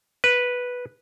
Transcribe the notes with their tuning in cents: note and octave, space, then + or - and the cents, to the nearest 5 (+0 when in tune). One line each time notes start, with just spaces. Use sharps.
B4 -5